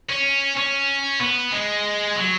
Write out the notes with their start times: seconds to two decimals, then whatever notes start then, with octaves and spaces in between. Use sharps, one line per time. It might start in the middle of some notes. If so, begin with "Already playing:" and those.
0.09 C#4
0.57 C#4
1.20 B3
1.52 G#3
2.16 F#3